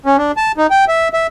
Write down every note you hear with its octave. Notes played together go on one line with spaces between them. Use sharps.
C#4
D4
A5
D#4
G5
E5
E5